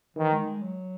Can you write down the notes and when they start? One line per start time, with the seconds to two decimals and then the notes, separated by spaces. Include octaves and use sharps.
0.16 D#3 E3
0.32 G#3
0.46 G#3
0.62 F#3